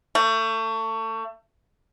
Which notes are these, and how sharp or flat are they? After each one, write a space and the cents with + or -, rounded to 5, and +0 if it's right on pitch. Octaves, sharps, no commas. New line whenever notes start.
A3 +30